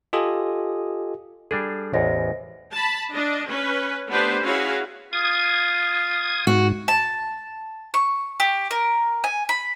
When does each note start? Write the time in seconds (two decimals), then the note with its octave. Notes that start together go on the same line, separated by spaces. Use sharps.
0.13 F4 G4 A4 D#5 G#5 D#6
1.51 G3 D4 G#4 A4
1.93 A1 E2 C5 D#5 A#6
2.73 A5 B5
3.12 D4 D#5
3.47 C#4 B4
4.09 A3 B3 D4 G4 B4 C5
4.43 C#4 E4 F#4 G#4 C#5 F5
5.13 F4 D#6 G#6
6.47 G#2 F#4
6.88 A5
7.94 C#6
8.40 G4
8.71 A#4
9.24 G#5
9.49 B5